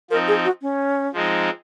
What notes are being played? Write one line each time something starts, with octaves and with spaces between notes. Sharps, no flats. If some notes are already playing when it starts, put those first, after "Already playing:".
F3 C4 D#4 A#4
G#4
F#4
C#4
F3 G#3 C4 D#4